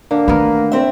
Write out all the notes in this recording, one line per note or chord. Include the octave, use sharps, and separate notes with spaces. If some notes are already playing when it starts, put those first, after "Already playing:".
D3 A#3
D#3 A3 B3 A#4 B4
C4 E5